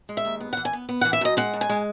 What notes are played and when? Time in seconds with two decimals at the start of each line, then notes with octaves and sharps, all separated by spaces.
0.09 G#3
0.17 E5
0.25 D#2
0.40 B3
0.53 F#5
0.57 E3
0.65 G#5
0.73 B3
0.89 B3
1.01 E3 F#5
1.13 E5
1.21 F#2 D#5
1.37 G#3 F#5
1.54 G#2
1.61 G#5
1.69 G#3